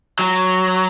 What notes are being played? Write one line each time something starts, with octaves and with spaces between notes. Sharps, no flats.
F#3